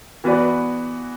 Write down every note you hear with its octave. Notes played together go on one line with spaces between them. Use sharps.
E3 B3 F#4 B4 D5